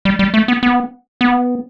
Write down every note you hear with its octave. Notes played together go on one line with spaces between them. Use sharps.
G3
G3
A3
B3
B3
B3